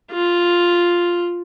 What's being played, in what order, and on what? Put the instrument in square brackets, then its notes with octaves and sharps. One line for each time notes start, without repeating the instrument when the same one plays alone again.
[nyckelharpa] F4